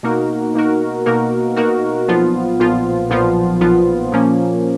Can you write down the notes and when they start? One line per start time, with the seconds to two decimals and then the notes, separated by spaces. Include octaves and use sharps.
0.03 B2 A#3 D#4 F#4 A#4
0.54 B2 A#3 D#4 F#4 A#4
1.06 B2 A#3 D#4 F#4 A#4
1.57 B2 A#3 D#4 F#4 A#4
2.08 B1 A#2 F3 B3 F4
2.60 B1 A#2 F3 B3 F4
3.10 B1 A#2 F3 B3 F4
3.61 B1 A#2 F3 B3 F4
4.12 A#2 F3 A#3 C#4